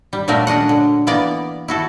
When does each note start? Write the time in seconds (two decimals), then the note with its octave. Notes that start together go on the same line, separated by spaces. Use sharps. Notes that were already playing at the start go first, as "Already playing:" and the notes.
0.13 G3
0.28 A#2 F#3 G3 A3 A#4
0.47 C#4 D4 D#5 F#5
0.69 D3
1.07 E3 A#3 B3 D5
1.68 E4 F#4 A4